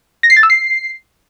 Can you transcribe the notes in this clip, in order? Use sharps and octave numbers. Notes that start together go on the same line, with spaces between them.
A#6
C7
A6
E6
C7